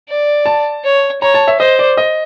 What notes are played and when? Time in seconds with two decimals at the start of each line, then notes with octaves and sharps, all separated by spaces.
0.09 D5
0.46 A5
0.84 C#5
1.22 C#5 A#5
1.34 A5
1.48 E5
1.59 C5 D#5
1.79 D5
1.97 D#5